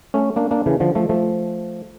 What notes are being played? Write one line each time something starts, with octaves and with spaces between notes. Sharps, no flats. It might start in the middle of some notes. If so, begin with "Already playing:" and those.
A3 C#4
A#3 D4
A#3 D4
C#3 E3
D3 F3
F3 A3
F3 A3